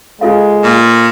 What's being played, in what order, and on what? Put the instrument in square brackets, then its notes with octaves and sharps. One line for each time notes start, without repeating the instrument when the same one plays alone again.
[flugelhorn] G#3 [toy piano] F4 A4 F5
[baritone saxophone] A#2